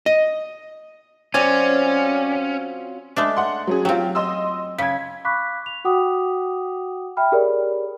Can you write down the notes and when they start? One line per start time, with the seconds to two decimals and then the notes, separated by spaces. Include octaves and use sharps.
0.06 D#5
1.34 F#3 C4 C#4 F4 D5 G#5
3.16 G#3 A3 D4
3.37 F#5 C6
3.67 F#3 C#4 G#4
3.85 F#3 C4 F4 G4
4.15 D#5 C6 E6
4.78 C#3 G#6 B6
5.25 F5 B5 C#6 D6 F#6 B6
5.66 F7
5.85 F#4 F#5 G5 D6 D#6
7.17 E5 G5 B5 F6
7.32 G4 G#4 A#4 C#5 D5